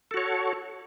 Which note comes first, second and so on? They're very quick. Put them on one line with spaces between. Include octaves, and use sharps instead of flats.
A4 F#4 C#5